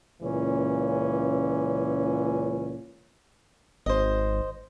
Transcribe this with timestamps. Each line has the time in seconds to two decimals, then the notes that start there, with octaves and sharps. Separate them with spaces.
0.22 C#2 A#2 E3 C#4
3.86 G#1 C5 D#5